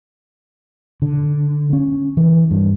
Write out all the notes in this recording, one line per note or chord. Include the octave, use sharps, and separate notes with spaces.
D3
C#4
E3
G2